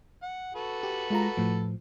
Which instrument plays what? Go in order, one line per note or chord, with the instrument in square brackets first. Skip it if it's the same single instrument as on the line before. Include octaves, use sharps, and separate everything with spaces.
[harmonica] F#5
F#4 A4 B4
[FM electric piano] G4
G#3 F4 A#5
A2 F3